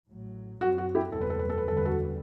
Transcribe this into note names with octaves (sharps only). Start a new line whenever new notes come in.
A1 A2 F#3
F#2 F#3 C4 F#4
F#4
E4 G4
F#1 E2 B2 G3 C4 A4
B4
A4
B4
A4
B4
F#1 E2 D3 G3 A4
B4
F#4 A4